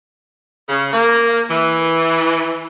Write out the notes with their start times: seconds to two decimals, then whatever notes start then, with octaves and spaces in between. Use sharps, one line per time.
0.69 C#3
0.93 A#3
1.49 E3